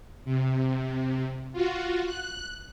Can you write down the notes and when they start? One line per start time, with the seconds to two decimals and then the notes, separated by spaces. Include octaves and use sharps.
0.25 C3
1.53 F4 F#4
2.06 F#6